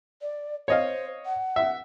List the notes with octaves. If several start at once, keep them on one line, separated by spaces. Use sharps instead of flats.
D5
C5 C#5 D#5 F5
F#5
E5